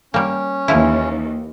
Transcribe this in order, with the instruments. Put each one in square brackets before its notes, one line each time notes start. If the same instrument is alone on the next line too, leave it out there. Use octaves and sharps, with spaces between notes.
[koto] G3 A#3 [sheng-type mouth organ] C#4
[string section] D#2 [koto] E3 F3 E4